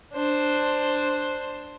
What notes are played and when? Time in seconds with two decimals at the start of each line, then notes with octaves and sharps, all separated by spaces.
0.13 D4 C5